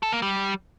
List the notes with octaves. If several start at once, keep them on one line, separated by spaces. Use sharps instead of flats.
A4
A#3
G3